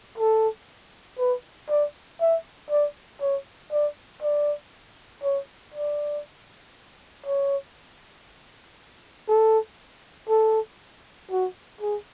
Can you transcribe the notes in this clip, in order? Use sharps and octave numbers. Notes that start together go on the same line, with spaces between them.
A4
B4
D5
E5
D5
C#5
D5
D5
C#5
D5
C#5
A4
A4
F#4
G#4